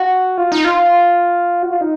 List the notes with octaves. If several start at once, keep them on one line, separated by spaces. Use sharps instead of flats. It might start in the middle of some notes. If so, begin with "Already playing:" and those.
Already playing: F#4
F4
D#4
F4
F#4
F4
D#4